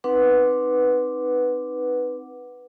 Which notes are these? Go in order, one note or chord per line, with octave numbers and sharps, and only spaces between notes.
C4 D#4 B4 F#5 D6